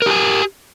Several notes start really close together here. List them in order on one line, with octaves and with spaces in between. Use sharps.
A#4 G4 G#5